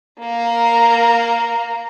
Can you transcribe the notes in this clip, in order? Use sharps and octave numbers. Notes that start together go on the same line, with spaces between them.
A#3 A#4